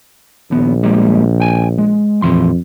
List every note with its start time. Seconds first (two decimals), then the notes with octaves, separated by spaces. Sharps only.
0.51 A#1 D#2 B3
0.83 G3 G#3 A#3
1.40 G5 G#5
1.78 G#3
2.22 F2 A#2 E3 C6